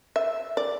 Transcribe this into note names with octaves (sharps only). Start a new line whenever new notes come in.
E5
D5